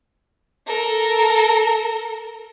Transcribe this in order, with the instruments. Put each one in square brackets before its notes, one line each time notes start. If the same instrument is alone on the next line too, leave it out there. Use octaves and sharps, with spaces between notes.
[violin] A4 A#4